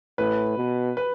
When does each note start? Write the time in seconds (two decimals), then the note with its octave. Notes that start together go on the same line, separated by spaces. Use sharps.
0.18 A2 B4
0.58 B2
0.97 B4